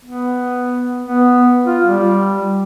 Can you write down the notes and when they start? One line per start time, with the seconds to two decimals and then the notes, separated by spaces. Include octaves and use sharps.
0.05 B3
1.06 B3
1.66 F4
1.86 G3